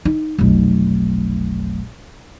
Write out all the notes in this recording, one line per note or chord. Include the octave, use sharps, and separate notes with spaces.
D#4
F1 B1